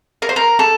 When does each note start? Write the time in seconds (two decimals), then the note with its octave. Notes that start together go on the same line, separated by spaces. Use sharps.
0.22 A#4
0.29 C5
0.36 A#4
0.59 A4